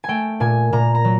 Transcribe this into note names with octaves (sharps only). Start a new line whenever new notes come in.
A3 G5 G#5
A#2 G#5
A#2 A#5
A#5
F#3